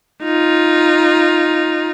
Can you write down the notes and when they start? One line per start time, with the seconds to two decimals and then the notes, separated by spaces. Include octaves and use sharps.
0.23 D#4 F4